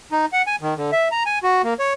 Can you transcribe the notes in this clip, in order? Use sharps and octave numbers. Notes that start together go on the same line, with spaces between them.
D#4
F#5
G#5
D#3
D3
E5
A#5
G#5
F#4
A#3
C#5